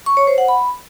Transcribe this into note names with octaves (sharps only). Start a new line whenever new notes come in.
C#6
C#5
C5
F#5
B5